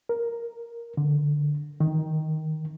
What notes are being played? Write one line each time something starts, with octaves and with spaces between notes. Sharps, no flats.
A#4
D3
D#3